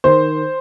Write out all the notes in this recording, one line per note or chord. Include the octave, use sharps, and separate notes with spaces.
D#3 C5